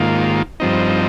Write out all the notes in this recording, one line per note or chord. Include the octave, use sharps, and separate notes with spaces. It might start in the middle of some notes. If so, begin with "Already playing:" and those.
Already playing: G#2 D#3 A#3 F4
G2 F3 C4 D#4